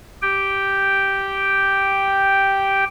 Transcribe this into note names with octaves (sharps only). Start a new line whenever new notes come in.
G4 G5